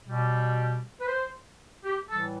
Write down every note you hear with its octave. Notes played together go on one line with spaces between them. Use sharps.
B2 G3
B4
C5
G4
A2 E3 G3 A4